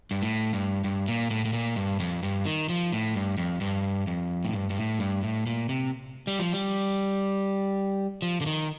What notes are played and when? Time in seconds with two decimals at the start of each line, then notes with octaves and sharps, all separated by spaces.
0.11 G2
0.23 A2
0.53 G2
0.84 G2
1.08 A#2
1.30 A2
1.45 A2
1.53 A#2
1.76 G2
2.00 F2
2.23 G2
2.46 D#3
2.69 F3
2.93 A2
3.15 G2
3.38 F2
3.61 G2
4.07 F2
4.45 A2
4.53 G2
4.70 G2
4.77 A2
4.99 G2
5.23 A2
5.46 A#2
5.69 C3
6.27 G3
6.39 F3
6.52 G3
8.22 F3
8.41 D3
8.46 D#3